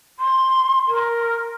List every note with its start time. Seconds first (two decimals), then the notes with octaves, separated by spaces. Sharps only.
0.19 C6
0.87 A#4